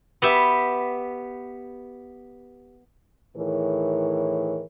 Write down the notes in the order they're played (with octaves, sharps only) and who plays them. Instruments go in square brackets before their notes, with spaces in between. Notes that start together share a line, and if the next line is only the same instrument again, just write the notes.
[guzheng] B3 G4 E5
[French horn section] A2 D#3 E3 G#4 A#4 C#5